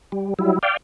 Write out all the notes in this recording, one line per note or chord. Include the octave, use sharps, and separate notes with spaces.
G3
F#3 G3 E4
D5 F5 G5